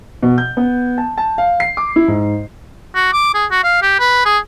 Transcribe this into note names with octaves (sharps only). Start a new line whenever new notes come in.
B2
G6
B3
A5
A5
F5
C7
D6
E4
G#2
F#4
D6
G#4
F#4
F5
G4
B4
G#4